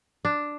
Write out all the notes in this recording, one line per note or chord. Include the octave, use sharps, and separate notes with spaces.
D4